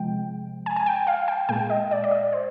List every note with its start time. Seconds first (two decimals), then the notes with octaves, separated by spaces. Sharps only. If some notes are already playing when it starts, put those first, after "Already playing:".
Already playing: C3 F3 G#3 G5
0.66 G#5
0.76 G#5
0.86 G5
1.07 F5
1.28 G5
1.49 A#2 G#3 G5
1.70 D#5
1.91 D5
2.04 D5
2.11 D#5
2.33 C5